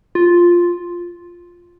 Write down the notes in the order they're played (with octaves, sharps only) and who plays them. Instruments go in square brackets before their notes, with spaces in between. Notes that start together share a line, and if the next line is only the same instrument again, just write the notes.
[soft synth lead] F4